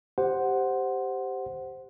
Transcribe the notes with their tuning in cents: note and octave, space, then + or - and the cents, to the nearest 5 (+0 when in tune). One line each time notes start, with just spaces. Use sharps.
G4 +0 C5 +0 F#5 +0